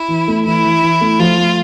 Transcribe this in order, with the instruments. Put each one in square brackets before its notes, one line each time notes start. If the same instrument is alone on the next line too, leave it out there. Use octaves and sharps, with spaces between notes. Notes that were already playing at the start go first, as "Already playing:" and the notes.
Already playing: [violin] E4
[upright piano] E3
A3
[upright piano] E3 [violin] E4
[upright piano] E3
E3
A3
[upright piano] F3 [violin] F4
[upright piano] A3